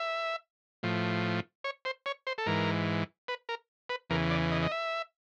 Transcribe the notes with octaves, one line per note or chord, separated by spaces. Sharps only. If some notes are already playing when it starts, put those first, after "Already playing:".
Already playing: E5
A2 F3
C#5
C5
C#5
C5
A4
G#2 E3 A#4
B4
A#4
B4
E2 C#3 E3 A#4
D5
D#5
D#5
E5